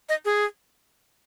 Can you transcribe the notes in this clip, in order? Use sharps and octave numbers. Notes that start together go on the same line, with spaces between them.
D#5
G#4